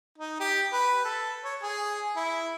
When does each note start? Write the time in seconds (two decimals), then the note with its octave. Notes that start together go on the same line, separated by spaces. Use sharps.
0.18 D#4
0.40 G4
0.72 B4
1.05 A4
1.44 C#5
1.62 G#4
2.16 E4